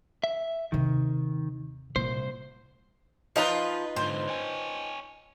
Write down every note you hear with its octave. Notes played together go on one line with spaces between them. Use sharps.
E5
D#2 C3 D#3
C2 A#2 C5
F3 D#4 F4 B4 D#5 A#5
G#2 D3 C5
C#5 G5 G#5